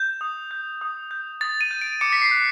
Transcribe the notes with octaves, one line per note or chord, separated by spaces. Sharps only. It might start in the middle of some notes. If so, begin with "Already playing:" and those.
Already playing: G6
D#6
G6
D#6
G6
D#6 A6
D#7
G6
D7
D6 C#7
B6
C7
F#6